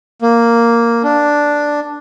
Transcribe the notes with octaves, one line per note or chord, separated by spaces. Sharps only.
A#3
D4